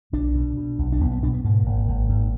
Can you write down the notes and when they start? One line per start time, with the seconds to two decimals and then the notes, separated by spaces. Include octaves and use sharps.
0.13 B1 D4
0.35 B2
0.57 B2
0.78 B1
0.92 D4
1.00 B1 B3
1.11 B3
1.22 B2 D4
1.33 B3
1.44 G#2 A#3
1.66 G#1
1.88 G#1
2.09 G#2